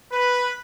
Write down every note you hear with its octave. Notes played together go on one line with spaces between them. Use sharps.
B4